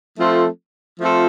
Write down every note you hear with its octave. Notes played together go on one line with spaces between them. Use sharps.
F3 A3 C4 F4 A4
F3 A3 C4 F4 A4